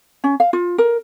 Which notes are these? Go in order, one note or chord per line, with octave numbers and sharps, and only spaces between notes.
C#4
F5
F4
A#4